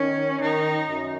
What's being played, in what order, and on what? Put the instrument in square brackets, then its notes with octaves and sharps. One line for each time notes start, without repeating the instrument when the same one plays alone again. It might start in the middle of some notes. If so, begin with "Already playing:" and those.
Already playing: [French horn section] D#3 [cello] C#4
[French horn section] D#3 [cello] D#4
[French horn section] F#2